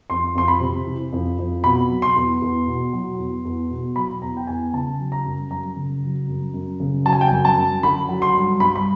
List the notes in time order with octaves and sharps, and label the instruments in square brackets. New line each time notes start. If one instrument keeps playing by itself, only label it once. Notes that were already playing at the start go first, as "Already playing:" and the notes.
[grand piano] F2 C6
F2 C6
B5
C3
E3
F2
F2
B2 B5
F#3
C6
E2
E2
B2
F#3
E2
E2
B2
F#3 B5
E2 A#5
G5
E2 G#5
C#3 A5
F#3
A#5
F#2
F#2 A#5
C#3
F#3
F#2
F#2
C#3
F#3 A5
G#5
G5
F#2 G#5
A5
F#2
D3 B5
F#3
C6
G2
G2 B5
B5